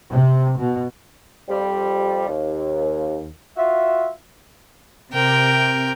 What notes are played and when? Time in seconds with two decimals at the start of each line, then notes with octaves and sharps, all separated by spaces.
0.11 C3
0.59 B2
1.48 F2 G3
2.27 D#2
3.56 F4 F#4 E5
5.13 C3 A#4 G5